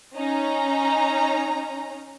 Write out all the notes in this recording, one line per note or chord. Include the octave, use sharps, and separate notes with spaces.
C#4 D#4 A#5